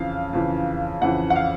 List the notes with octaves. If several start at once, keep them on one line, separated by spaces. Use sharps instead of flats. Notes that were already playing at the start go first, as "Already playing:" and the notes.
Already playing: F2 C#3 E3 F5
F2 C#3 E3
F2 C#3 E3 F#5
F#5
F5